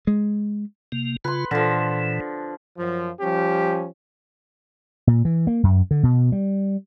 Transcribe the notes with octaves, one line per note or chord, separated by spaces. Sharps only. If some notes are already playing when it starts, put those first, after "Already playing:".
G#3
C3 A#3
C#3 F4 B4 C6
A#2 D3 E3 F3
F#2 F3
F3 G3 C#4 G4
A#2
E3
A#3
F#2
D3
B2
G3